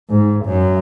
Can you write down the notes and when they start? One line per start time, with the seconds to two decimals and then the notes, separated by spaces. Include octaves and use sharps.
0.10 G#2
0.45 F#2